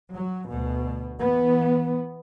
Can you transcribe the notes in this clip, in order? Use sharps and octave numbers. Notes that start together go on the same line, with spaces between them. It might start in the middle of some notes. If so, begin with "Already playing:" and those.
F#3
D2 B2
E3 B3